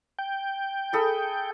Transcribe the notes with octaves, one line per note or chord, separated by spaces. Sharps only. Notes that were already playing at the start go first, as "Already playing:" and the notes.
G5
G#4 A4 B5